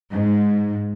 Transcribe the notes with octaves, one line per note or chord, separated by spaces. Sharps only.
G#2